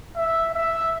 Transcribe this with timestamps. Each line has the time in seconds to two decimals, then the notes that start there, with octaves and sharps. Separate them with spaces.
0.16 E5
0.54 E5